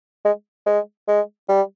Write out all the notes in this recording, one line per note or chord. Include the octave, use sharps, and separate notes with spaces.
G#3
G#3
G#3
G3